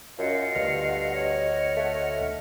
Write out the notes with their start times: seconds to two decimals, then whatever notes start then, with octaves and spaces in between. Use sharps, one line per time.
0.18 F#2 F4 D#5 F5 F#5
0.55 D2 G2 F6
1.11 C#5 F#5
1.76 A3